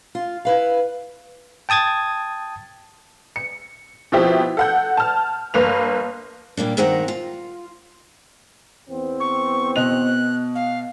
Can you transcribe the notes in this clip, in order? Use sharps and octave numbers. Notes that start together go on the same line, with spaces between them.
F4
E4 B4 F5
G5 A5 D#6 G#6 A6
C#7
B2 F3 C4 E4 G4
A4 F#5 G6
A5 F6
G1 A#3 B4 F7
A#2 G3 A#3 D4
G2 D#3 C4 A#4 F#5 A#5
F4
E2 B3 C4
C#6
B2 D#5 F#6 F7
F5